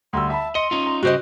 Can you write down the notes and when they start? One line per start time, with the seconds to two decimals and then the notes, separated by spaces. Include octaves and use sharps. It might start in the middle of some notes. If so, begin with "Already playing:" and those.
0.13 D2 G3 C6 E6
0.30 E5 A5 B5
0.55 D#5 C6 C#7
0.71 C#4 D#4 F4
0.86 A#5
1.03 G2 C#3 F#4 G4 C5 D#5 F#6